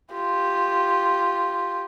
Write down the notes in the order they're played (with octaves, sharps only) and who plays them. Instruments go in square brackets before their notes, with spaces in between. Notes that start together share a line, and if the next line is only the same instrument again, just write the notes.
[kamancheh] F4 G4